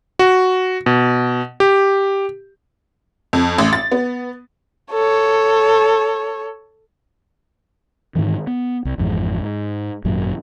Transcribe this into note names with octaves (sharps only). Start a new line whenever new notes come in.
F#4
B2
G4
F2
A1
A6
B3
A4 C#5
G#2 C3 D#3 E3
B3
C2
G#1 F2 G#2 E3
G#2
G#1 F#2 A#2 F#3